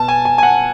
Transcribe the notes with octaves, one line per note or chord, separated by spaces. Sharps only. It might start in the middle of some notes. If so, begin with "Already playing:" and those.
Already playing: B2 A5
G#5
G#5
G#5
F#5